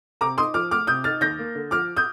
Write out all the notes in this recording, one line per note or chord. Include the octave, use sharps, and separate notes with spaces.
C3 A#5 D6
D#4 C6 D#6
F3 D6 F6
A3 D6 F6
C3 D#6 G6
D#4 F6 A6
D#2 G6 A#6
A#3
D3
F3 D6 F6
D#6 G6